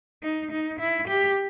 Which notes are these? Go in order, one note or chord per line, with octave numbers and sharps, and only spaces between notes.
D#4
D#4
E4
G4